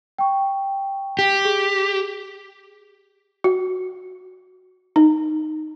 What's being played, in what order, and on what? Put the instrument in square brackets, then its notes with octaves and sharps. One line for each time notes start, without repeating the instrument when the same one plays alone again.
[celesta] G5 C#6
[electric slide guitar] G4
[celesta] G#4
[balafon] F#4
D#4